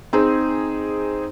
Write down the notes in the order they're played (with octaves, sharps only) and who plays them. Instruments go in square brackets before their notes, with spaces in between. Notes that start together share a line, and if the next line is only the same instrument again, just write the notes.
[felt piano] C4 D#4 G#4